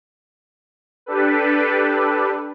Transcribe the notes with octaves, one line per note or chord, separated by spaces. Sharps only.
D4 G4 A4 B4